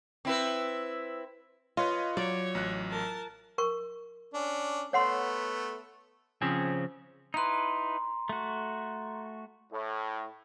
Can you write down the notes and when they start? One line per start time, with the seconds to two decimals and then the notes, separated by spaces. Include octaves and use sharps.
0.25 C4 E4 B4
1.77 F4 B4 C#5 D#5
2.17 F#3 C#5 D5
2.55 A1 F#3 F#6
2.90 A#4 A5
3.58 A#4 C#6
4.34 C#4 D4
4.93 A3 B3 C#5 F#5 C6
6.42 C#3 F3 C4 C#4 G#4
7.34 D#4 E4 B4 A#5 C6
8.29 A3 F#4
9.71 A2